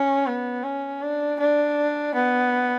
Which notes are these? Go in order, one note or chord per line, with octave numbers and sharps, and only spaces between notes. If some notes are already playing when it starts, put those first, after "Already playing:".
Already playing: C#4
B3
C#4
D4
D4
B3